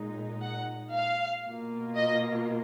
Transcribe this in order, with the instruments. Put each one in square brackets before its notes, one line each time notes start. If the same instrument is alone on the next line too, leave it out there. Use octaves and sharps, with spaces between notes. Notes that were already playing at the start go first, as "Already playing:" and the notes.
Already playing: [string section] A#2 G#3 D#4
F#5
F5
B2 A#3 F4
D#5